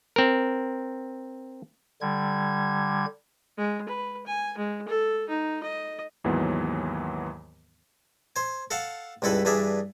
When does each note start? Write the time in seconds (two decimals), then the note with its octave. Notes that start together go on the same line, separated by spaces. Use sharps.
0.16 C4 A#4
2.01 D3 G3 G#6
3.57 G#3
3.88 B4
4.26 G#5
4.58 G#3
4.88 A4
5.29 D#4
5.63 D#5
6.24 D#2 G#2 E3 F#3 B3
8.36 C5 G#5
8.71 A4 F5 F#5 A5
9.22 C#2 G2 E4 A4 B4 B5
9.45 G2 E3 D4 G#4 E5